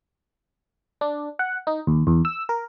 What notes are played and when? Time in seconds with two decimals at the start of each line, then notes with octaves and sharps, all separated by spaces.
1.01 D4
1.39 F#5
1.67 D#4
1.87 D#2
2.07 E2
2.25 E6
2.49 A#4